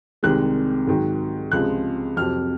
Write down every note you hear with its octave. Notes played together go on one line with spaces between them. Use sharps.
C2 C3 D#3 G#3 F#6
G#2 D#3 F#3
C#2 C3 F3 G#3 F#6
F2 C3 F#3 F6